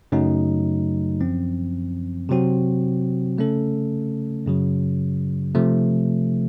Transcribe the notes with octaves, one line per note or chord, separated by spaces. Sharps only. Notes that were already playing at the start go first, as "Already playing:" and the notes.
F#2 C#3 F#3 A3 D#4
F#2 F3 C4
C3 F#3 C4 F#4
C#3 A3 C#4 A4
F#2 C#3 F#3
C3 F3 A3